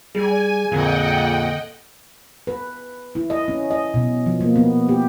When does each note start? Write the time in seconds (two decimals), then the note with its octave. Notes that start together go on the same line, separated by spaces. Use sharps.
0.15 G3 G#4 G#5
0.72 F2 A#2 D3 D#5 F#5 G5
2.47 B4
3.15 E4
3.30 D#5
3.48 C#4
3.71 D#5
3.94 B2
4.26 F3
4.41 A#3
4.56 B3
4.89 G4